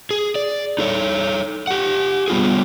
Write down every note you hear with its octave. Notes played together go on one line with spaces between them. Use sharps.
G#4
D5
D#4 A4 C#5
G4 F#5
G3 B3 F4 G#4